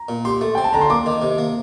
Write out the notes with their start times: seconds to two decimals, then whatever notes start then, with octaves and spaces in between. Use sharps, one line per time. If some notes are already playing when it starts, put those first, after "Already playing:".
Already playing: A#5
0.09 A#2
0.25 G4 C6
0.41 A3
0.55 C4 G5
0.64 A5
0.73 D3 A#5
0.81 C6
0.90 A#3 D6
1.06 D#3
1.22 C3
1.38 A#3